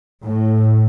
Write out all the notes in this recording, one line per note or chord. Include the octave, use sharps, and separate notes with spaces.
A2